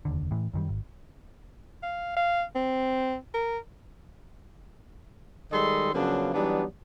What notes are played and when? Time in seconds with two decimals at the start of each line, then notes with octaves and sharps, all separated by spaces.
0.05 F1 D#2 D3
0.31 A2 E3
0.53 F#2 D#3 G3
0.69 G#1
1.83 F5
2.16 F5
2.55 C4
3.34 A#4
5.52 D#3 G3 G#3 A4 D#5 C6
5.94 C#3 F3 F#3 A#3 B3 D4
6.34 E3 F#3 G3 B3 D4 D#4